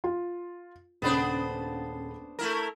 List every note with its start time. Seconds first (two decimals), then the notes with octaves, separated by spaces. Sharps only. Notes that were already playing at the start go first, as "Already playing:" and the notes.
0.04 F4
1.02 D#1 C#3 B3 D4 C5 B5
2.39 A3 E4 A#4